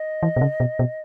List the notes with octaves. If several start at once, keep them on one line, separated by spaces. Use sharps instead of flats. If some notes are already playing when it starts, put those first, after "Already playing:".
Already playing: D#5
E3
B2
C#3
B2
B2